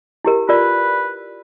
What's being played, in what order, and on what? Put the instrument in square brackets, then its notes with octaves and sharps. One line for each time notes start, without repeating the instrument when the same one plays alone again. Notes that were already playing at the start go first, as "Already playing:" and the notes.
[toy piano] E4 G4 A#4
[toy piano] F4 A#4 D5 [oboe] B4